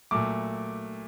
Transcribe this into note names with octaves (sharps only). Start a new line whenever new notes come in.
A#2 F#3 A3 D6